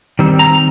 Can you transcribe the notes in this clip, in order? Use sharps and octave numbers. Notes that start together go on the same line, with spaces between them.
D#3 G3 C4
A#5